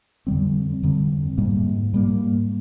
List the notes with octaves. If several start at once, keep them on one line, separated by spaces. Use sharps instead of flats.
F2 D3 G3 C4
F2 D3 G3 C4
G#2 G3 A#3
G#2 G3 A#3